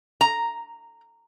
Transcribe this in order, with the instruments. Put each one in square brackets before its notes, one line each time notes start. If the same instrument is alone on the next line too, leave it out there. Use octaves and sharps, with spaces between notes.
[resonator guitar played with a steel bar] A#5